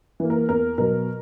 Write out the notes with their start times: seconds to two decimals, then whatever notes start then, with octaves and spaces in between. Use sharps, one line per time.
0.20 E3 A#3
0.30 A#4
0.49 E2 A#4
0.78 B2 F#3 A#4